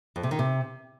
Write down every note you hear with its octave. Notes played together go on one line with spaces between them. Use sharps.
F2
C3
D#3
C3